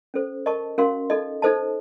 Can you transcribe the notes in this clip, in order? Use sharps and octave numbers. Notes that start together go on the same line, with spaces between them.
C#4 A4 C5
A#4 D#5 A5 C#6
C#4 F#4 A#4 F5 C6
D#4 A4 D#5
D#4 A4 C5 D#5 A5